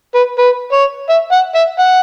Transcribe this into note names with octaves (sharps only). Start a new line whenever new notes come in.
B4
B4
C#5
E5
F#5
E5
F#5